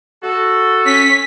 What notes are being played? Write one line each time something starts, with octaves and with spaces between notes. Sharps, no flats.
F#4 A4
C#4 B6